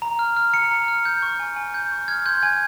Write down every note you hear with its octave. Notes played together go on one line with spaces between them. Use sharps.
A#5
F6
F6
A#5 C#7
A#5
F6
G6
C#6
G#5
G#5
G6
C#6
F6 G#6
C6 G6
G#5 G#6